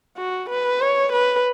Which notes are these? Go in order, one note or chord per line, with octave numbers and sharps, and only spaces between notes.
F#4
B4
C#5
B4